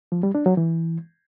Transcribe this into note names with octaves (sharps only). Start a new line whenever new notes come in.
F3
G3
D4
F#3
E3